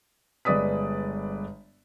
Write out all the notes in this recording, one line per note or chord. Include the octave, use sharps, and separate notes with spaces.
G1 G#3 B4 D5 D#6 B6